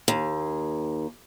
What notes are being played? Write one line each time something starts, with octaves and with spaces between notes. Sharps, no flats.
D#2